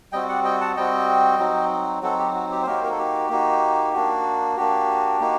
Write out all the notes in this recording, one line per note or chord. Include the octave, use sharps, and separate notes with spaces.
G3 C4 F#4 D#5 G5
D5 F#5
D#5 G5
F#5 A5
G3 C4 F#4 D#5 G5
F#3 C4 D#4 F#4
F#3 C4 D#4 F#4 A4
G4
F#4
G4
C5
A#3 D#4 F#4 G4 A#4
C5
A#4
A4
G4
A#3 D#4 F#4
A#3 D4 F#4
A#3 D4 F#4 G4
A#3 D#4 F#4